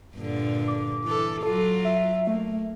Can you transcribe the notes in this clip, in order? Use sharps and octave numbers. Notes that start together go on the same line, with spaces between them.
G2 A#2 D3
D6
E3 A4
F#3 F4 A4
E5
A3 A#3